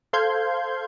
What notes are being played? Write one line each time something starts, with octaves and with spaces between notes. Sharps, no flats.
A4 C5 F5 C6 G6 G#6